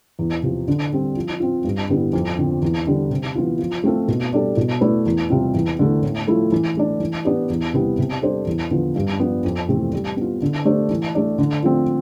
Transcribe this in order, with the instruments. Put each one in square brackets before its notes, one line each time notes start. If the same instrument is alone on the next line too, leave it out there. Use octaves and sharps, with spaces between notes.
[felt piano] E2
C3 F3
D3
G3 C4
F3
C4 F4
G2
D3 G3 B3 E4
F2
D3 F3 C4
E2
D3 G3
C3
E3 B3 F4
F3
A3 C4 F4 A4
B2
G3 D4 A4
B2
A3 E4 B4 D5
E2
C3 G3 C4 F4
E2
D3 A3 E4
A2
F3 A3 E4 A4
E3
A3 D4
E3
B3 D4 G4 D5
E2
C3 G3 B3 E4
C3
G3 D4 A4 C5
E2
D3 F3 B3
G2
F3 B3 D4
F2
C3 E3 A3 C4
G3
B3 F4
D3
A3 D4 G4 C5
E3
A3 D4
D3
F3 A3 C4